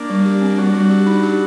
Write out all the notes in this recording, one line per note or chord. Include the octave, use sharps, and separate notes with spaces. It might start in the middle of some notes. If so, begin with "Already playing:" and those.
Already playing: A#3 D4
G3
G4
C4
G3 D4 F#4
G3
G4
D#4
G4